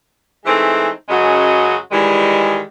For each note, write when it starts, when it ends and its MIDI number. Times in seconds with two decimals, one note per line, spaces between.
0.45 0.89 52
0.45 0.89 56
0.45 0.89 57
0.45 0.89 60
0.45 0.89 63
1.09 1.75 42
1.09 1.75 49
1.09 1.75 54
1.09 1.75 56
1.09 1.75 66
1.09 1.75 75
1.91 2.60 51
1.91 2.60 52
1.91 2.60 55
1.91 2.60 56